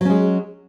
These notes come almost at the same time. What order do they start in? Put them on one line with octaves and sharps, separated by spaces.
F#3 C#4 G#3